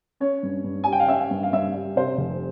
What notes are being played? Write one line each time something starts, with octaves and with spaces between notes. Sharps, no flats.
C#4 C#5
G2
G2
G3 G#5
G5
F5
C#4 E5
G2
F5
G2 E5
G3
C3 C5
F1